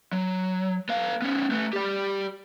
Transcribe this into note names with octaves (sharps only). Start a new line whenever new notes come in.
F#3
B3 F5
B3 C#4
A3 B4
G4 D5